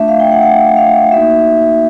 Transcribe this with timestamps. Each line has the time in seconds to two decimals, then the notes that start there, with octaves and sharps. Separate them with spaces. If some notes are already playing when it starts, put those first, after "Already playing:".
Already playing: A3 D4 F4 E5
0.08 F5
0.20 G5
0.31 F#5
0.42 F#5
0.77 F5
1.12 A#3 D#4 F#4 E5